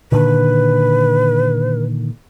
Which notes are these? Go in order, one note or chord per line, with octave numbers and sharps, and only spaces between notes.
A#2 D3 D#3 B4